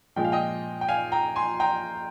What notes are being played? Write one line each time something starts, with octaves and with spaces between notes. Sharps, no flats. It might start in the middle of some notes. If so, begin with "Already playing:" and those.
A#2 F3 G#3 G5
F5
D#5 G5
G5
F5 G#5
G5 A#5
G#5 C6
G5 A#5